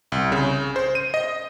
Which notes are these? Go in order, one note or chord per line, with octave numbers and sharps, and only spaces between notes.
C2
C#3
C5
D#7
D#5